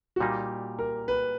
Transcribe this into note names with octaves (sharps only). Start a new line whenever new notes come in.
F#4
A#2 G3 A#3 D#4 G4
A#4
B4